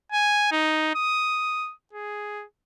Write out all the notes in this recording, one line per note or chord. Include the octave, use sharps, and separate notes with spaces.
G#5
D#4
D#6
G#4